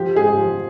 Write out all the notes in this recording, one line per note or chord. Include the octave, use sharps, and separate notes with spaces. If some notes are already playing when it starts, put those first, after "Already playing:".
Already playing: F3 G4
G#2 G#4
G4
F3